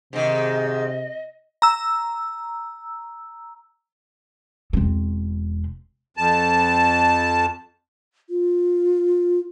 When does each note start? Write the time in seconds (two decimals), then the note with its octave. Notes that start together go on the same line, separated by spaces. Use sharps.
0.13 G#2 C3 D#3 D#5
1.62 A#5 E6
4.73 E1 C4
6.17 F2 A5
8.30 F4